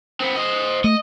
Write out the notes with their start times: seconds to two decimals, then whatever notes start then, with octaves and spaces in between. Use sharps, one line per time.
0.20 B3 C4
0.35 C5 D#5
0.84 A3 D#5